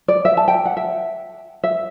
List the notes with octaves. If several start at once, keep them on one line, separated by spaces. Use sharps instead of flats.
D5
E5
A5
G5
F#5
E5
E5